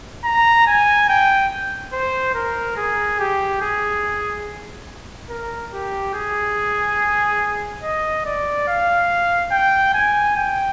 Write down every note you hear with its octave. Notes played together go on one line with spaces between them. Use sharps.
A#5
G#5
G5
C5
A#4
G#4
G4
G#4
A#4
G4
G#4
D#5
D5
F5
G5
G#5
G5